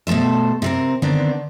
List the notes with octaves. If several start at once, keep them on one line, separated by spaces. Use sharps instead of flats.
B2 A3 A4 C5 E5
C3 C4 A#4
D3 D#3 B3 C4 D4